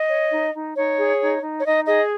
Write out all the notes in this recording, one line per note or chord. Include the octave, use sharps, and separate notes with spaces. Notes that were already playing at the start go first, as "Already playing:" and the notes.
Already playing: D#5
C#5
D#4
D#4
D#4 C#5
G#4
D#4
D#4
C#5
D#4 D#5
G#4 D#5